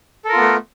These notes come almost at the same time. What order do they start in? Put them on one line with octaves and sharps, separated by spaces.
A4 A#4 F4 B3 A3